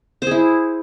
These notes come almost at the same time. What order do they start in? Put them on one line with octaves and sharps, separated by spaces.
C5 G#4 E4